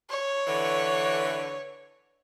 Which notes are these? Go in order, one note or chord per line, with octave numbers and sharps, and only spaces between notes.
C#5
D3 E3